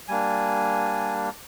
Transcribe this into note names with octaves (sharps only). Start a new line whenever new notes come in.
G3 A#3 D4 G#5